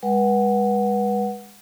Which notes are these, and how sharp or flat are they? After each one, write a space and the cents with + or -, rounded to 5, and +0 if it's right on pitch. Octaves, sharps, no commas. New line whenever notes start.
G#3 -35 B4 -30 F#5 +0